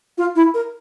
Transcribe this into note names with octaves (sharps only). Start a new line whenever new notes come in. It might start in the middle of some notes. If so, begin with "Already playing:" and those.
F4
E4
A#4